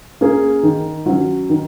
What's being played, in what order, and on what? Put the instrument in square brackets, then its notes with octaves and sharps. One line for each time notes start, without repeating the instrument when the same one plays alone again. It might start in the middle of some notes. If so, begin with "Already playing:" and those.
[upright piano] A#3 C#4 G#4
D#3
F#3 C#4
D#3